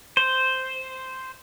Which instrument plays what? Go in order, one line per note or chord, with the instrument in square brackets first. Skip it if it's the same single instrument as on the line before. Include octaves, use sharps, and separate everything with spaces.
[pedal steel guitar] C5